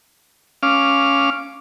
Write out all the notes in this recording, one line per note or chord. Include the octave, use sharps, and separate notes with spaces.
C#4 F5 D6 F6